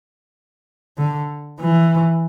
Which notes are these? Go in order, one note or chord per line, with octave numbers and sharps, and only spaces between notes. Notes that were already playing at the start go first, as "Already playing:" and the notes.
D3
E3